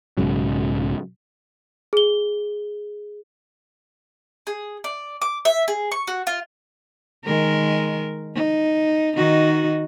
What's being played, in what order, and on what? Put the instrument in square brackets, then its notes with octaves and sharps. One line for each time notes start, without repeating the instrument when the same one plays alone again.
[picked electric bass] B1 G#2 C#3 F#3
[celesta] G#4 G7
[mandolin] G#4
D5
D6
E5
G#4
C#6
F#4
F4
[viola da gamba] D#3 G#3 A#4
D#4
D#3 D#4 F#4